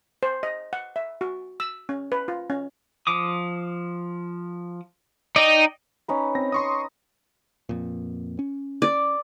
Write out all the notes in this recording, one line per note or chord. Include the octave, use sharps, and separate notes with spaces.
C5
D#5
F#5
E5
F#4
E6
C#4
B4
F4
C#4
F3 D6 D#6
D#4 D5 D#5 G5
C#4 D#4 B4
C4 A#6
C6 C#6 D#6
F2 A#2
C#4
D5